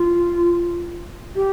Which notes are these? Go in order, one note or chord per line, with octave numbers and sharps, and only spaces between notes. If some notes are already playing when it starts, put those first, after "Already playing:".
Already playing: F4
G4